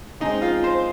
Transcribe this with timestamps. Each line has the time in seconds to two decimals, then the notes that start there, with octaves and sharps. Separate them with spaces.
0.20 C#3 G#3 C4 D#4
0.42 F4
0.64 C5